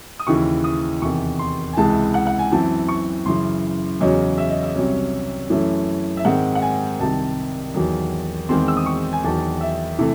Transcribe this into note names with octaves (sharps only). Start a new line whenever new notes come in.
D#6
D#2 C#3 E3 C#6
D#6
E2 C3 D#3 C#6
C6
G#5
C#2 C3 E3 G#3 A5
F#5
F#5
G#5
F#2 E3 C4 A5
C#6
F#2 C#3 E3 C6
E2 C#3 F#3 C#4 D#5
E5
D#5
E5
C2 C3 F#3 C#4
F#2 E3 A3 C#4
E5
G#2 D#3 G#3 C4 F#5
F#5
G#5
C2 C3 D#3 A5
E2 D#3 F#3
E2 D#3 G#3 C4 C6
E6
D#6
C#6
G#5
E2 D#3 F#3 A5
E5
C3 E3 A3